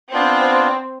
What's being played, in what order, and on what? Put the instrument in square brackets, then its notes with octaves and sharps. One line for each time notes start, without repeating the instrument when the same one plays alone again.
[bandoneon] B3 D4 F4 [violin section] C4